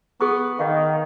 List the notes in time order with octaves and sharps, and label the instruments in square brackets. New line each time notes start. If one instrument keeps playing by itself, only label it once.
[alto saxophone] B3 [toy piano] G#4 C#6
[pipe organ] D#3 [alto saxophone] D#4 [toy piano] F5 F#5